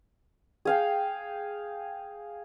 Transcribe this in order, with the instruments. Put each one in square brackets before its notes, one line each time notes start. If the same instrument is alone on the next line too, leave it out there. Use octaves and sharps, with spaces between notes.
[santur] G#4 F5 G5